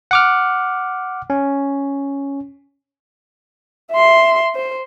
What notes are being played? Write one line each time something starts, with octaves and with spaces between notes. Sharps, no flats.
F#5 D6 F6
C#4
E5 C6
C5